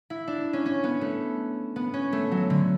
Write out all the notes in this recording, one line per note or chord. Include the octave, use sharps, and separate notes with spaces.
E4
D4
C#4
C#4
B3
A3
B3
C#4
A3
F#3
D3